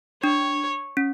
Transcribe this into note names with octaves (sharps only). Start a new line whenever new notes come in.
D4 C#5
C#4